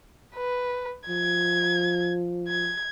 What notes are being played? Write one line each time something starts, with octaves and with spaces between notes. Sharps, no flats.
B4
F3 G#6
G#6